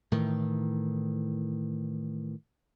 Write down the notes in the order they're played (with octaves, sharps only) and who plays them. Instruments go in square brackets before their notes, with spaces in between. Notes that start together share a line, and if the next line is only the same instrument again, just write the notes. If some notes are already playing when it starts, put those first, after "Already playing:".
[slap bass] A2 D#3 E3